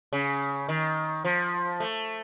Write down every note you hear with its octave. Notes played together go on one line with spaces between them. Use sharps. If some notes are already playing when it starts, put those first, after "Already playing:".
C#3
D#3
F3
A3